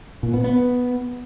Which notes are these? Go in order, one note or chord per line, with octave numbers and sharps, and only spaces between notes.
A#2
B3
B3